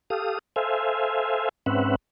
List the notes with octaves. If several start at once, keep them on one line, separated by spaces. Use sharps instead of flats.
G4 A4 F5 D#6
A4 C5 E5 F5 G#5
G#2 C4 C#4 B4 E5 F#5